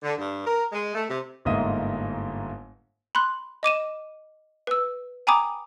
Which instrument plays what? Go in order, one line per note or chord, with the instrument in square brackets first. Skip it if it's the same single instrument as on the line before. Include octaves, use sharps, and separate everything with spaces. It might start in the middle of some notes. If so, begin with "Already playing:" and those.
[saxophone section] D3
G2
A#4
G#3
A3
C3
[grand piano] G1 G#2 A#3 D#5 E5 D#6
[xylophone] B5 C6 F#6
D#5 D6 D#7 E7
B4 E6
G5 G#5 A#5 B5 D6 D#6